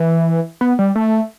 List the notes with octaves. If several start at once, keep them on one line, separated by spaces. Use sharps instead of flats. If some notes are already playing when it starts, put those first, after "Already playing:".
Already playing: E3
B3
G3
A3